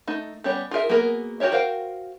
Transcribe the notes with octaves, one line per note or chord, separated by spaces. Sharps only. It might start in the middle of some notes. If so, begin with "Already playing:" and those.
A3 D#4
G3 B3 C#4 G4 C#5
F4 G#4 A#4 E5
F#3 A#3 B3 G#4 A#4
F#4 G4 A#4 C#5 E5
F#4 A#4 C5 F5 G5